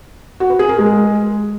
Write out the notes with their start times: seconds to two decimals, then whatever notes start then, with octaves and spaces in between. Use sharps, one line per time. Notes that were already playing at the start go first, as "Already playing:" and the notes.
0.40 F#4
0.50 B4
0.59 G#4
0.69 A#4
0.78 G#3